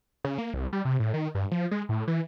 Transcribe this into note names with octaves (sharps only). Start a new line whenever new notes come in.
C#3
A#3
C2
G3
C3
A2
D#3
G2
F3
G#3
A2
E3